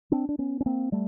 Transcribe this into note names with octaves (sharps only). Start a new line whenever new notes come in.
C4 D4
D4
B3 C#4
C#4
A#3 C4
G3 A3